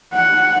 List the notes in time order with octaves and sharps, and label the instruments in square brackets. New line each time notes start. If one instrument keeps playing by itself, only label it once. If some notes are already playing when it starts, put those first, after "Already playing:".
[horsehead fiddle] F#5